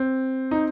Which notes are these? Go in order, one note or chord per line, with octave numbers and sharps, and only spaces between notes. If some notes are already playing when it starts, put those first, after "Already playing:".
Already playing: C4
D#4